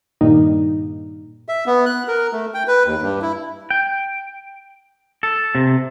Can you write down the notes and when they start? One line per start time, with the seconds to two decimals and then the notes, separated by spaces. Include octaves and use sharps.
0.21 G2 A#2 D#3 G3 A#3 D#4
1.49 E5
1.66 B3
1.86 F#6
2.08 A#4
2.33 A3
2.54 G5
2.68 B4
2.85 D#2
3.02 G2
3.22 E4
3.70 G5
5.23 A4
5.55 C3